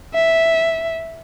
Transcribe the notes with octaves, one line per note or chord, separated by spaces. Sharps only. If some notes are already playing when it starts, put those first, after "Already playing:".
E5